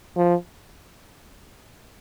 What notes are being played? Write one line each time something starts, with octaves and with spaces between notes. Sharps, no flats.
F3